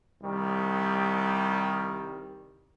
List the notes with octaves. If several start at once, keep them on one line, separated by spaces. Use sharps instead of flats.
C2 D#3 G3